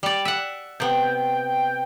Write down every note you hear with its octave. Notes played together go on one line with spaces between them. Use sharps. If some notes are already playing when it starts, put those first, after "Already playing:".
G3 D5
E5 F#5
C3 B3 G5